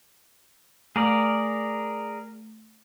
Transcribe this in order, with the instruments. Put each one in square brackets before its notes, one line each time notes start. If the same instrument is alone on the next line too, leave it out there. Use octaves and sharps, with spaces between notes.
[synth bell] A3 [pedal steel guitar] G#4 A#4 D5